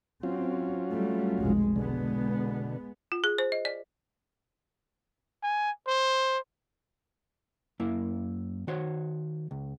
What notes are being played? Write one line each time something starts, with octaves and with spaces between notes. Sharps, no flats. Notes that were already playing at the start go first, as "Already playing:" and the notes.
F#3 C4 C#4 F4
G3 A3
F1 B1 G#3
B2 D3 G#3 B3
F4
G#4
C5
D#5
D5
G#5
C5
F#2 A#3 E4
D#3 F#4 C5 C#5
C#2